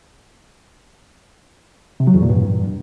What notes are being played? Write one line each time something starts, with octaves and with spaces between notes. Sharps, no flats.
C3
F#3
E2
A#2
G2